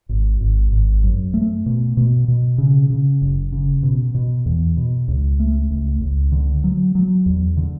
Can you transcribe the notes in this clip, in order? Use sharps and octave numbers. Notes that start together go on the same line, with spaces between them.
G#1
G#1
G#1
F#2
A3
B2
B2
B2
C#3
C#3
F#1
C#3
B2
B2
E2
B2
C#2
A3
C#2
C#2
D3
F#3
F#3
E2
D3